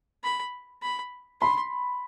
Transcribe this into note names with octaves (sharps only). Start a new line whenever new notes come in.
B5
B5
B5 C6